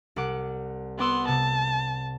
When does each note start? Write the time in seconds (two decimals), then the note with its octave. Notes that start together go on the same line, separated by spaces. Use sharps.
0.16 C2 F#5 D6
0.99 B3 F#5 C6 D6 E6
1.28 C3 A5